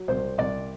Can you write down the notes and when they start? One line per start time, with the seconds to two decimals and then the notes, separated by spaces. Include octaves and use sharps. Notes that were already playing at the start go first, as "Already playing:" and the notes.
Already playing: F#3
0.08 C2 C5
0.38 C2 D5